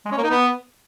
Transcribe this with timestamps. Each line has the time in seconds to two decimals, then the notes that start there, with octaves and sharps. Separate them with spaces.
0.05 G#3
0.11 C#4
0.18 A#3
0.24 D#4
0.30 B3